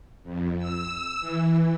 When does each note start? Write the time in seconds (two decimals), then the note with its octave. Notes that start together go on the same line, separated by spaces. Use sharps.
0.23 F2
0.58 E6
1.19 E3